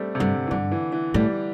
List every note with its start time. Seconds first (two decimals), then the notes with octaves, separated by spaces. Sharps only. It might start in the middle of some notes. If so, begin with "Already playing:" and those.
Already playing: G3 A3 C4
0.15 C3
0.20 G2 D3
0.47 E3
0.51 G2 D3
0.72 E3
0.92 E3
1.14 A2 G3